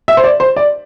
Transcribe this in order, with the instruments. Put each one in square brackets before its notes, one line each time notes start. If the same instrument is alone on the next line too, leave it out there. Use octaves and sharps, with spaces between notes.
[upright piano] E5
C5
D5
C5
D5